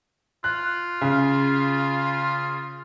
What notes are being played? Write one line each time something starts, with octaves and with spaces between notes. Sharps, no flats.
F4 F#6
C#3